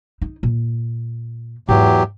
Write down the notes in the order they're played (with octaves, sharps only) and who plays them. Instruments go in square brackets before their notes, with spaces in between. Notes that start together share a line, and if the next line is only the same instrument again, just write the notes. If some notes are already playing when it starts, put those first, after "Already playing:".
[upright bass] D#4
A#2
[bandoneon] E2 F#3 G4 [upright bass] G#2